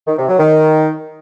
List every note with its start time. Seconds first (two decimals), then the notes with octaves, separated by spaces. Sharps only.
0.07 D#3
0.18 C3
0.28 F#3
0.39 D#3